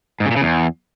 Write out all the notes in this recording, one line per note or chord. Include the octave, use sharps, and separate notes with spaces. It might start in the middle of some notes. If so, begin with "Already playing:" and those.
G#2
C#3
A#2
C#3
E2